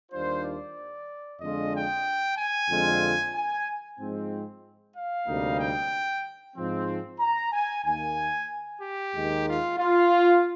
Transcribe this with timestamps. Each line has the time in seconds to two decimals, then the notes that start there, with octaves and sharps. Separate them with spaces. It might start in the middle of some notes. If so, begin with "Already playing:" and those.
0.12 D#2 D#3 G3 D4 F4 C5
0.44 D5
1.40 F2 D3 G#3 D4 F4 D#5
1.74 G5
2.37 G#5
2.69 F2 D3 G#3 C4 F4
3.34 G#5
3.99 G#2 F3 G#3 C4
4.96 F5
5.27 D2 C3 G3 A#3 D#4
5.59 G5
6.56 G#2 F3 C4
7.20 A#5
7.52 G#5
7.85 D#2 D#3 A#3 G#5
8.81 G4
9.13 D#2 D#3 G#3
9.46 F4
9.77 F4